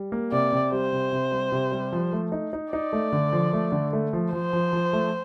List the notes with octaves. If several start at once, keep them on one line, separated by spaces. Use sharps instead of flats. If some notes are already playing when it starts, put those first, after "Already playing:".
Already playing: G3
A#3
C3 D5
C3
G3 C5
C3
C3
G3
C3
G3
F3
A3
D#4
D#4
D#4 D5
A3
D3
F3
A3
D3
A3
F3
F3 C5
F3
F3
A3